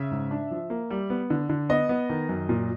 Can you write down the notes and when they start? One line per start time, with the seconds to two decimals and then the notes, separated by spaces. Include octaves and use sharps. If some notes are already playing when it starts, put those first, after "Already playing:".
Already playing: C#3 E5
0.11 G#2
0.31 D4
0.51 F3
0.70 A#3
0.90 G3
1.10 B3
1.30 D3
1.49 D3
1.69 B3 D#5
1.89 B3
2.10 D#3
2.29 F#2
2.49 A#2